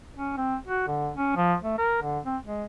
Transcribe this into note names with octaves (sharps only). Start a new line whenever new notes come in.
C#4
C4
F#4
D3
C#4
F3
A3
A#4
D3
C4
G#3